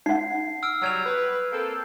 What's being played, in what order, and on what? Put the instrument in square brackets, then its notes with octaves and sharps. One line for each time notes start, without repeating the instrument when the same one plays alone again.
[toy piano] D#4 F#5 [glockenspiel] C7
[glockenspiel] E6 F6 D7
[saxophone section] F#3 G3 [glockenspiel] F6 G#6 F7
[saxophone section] B4
A#3 C4 A4